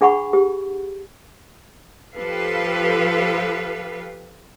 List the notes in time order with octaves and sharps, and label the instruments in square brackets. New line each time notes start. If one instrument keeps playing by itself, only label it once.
[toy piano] D4 G#4 F#5 B5 C#6
G4
[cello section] F3 G4 A4 B4 F5